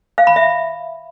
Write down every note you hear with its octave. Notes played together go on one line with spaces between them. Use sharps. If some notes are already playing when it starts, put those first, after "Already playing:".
F5
B5
E5